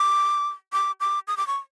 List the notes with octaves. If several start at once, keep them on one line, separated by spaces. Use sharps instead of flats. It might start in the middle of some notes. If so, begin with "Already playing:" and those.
Already playing: D6
D6
D6
D#6
D6
C#6